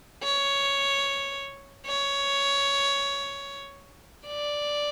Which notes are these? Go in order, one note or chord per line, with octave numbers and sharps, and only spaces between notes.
C#5
C#5
D5